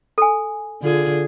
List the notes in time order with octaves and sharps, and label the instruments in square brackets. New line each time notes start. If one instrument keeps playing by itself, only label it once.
[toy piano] A4 G#5
[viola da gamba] D3 F4 G#4